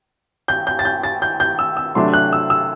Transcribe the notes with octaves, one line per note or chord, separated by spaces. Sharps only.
G6
G6
A6
G6
A6
G6
G6
E6
E6
C3 F#3 A3 D4 C6
F#6
E6
E6